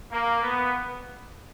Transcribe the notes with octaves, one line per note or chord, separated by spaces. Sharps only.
A#3
B3